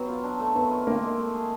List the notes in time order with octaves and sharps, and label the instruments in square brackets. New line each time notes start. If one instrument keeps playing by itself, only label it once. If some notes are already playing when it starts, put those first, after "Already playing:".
Already playing: [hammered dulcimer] F#3 C4 [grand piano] B3
[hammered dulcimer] F4
D4
A3
[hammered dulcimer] D#3 [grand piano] B3
[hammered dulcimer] F4
[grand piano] A#3 [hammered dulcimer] C4
[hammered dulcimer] G#3
A3
G#4